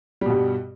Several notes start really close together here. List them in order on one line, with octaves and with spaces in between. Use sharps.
G3 B2 G2